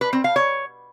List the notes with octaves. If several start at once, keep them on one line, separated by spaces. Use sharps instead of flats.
B4
C4
F5
C#5